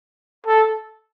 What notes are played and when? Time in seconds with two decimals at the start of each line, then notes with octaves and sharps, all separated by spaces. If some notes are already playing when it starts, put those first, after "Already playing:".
0.47 A4